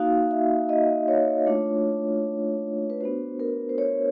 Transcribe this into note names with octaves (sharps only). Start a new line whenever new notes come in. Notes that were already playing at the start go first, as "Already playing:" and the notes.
Already playing: A#3 D#4 F#4 F5
E5
D#5
C#5
A3 D4 F4
B4
B3 D4 F#4 C5
A#4
C5
C#5